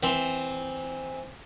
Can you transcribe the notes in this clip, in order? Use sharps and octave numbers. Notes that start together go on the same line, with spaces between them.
E3 C4